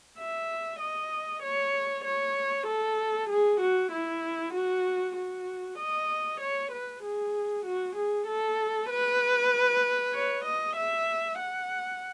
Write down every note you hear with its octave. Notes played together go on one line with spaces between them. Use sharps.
E5
D#5
C#5
C#5
A4
G#4
F#4
E4
F#4
F#4
D#5
C#5
B4
G#4
F#4
G#4
A4
B4
C#5
D#5
E5
F#5